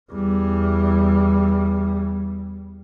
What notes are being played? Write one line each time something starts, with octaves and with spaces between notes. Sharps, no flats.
E2 G3